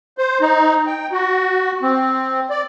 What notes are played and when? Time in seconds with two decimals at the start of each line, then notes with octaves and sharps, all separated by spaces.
0.18 C5
0.41 D#4
0.87 G5
1.12 F#4
1.82 C4
2.50 D5